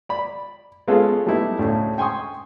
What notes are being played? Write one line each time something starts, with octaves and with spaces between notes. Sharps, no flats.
D5 B5
G#3 B3 C#4 F4 G#4 A4
G3 A3 B3 D#4 E4 G4
D2 A2 C#3
G5 G#5 C6 C#6 D#6